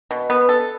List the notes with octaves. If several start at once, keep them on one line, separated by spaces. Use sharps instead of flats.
B2
B3
A4